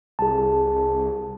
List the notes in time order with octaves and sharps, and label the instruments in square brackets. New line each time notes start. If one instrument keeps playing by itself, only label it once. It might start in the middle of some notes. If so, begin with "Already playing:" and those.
[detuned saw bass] C2 [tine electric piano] G#4 A5